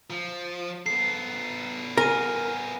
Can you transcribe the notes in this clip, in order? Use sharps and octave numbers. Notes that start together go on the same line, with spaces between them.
F3
B3 A4 C7
A#4 G#5 D#7